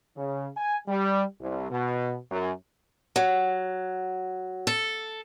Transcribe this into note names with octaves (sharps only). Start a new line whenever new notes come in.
C#3
G#5
G3
C2
B2
F#2
F#3
A4